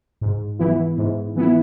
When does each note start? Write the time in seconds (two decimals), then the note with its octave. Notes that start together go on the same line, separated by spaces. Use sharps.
0.21 G#2
0.59 E3 B3 E4
0.98 G#2
1.36 E3 B3 E4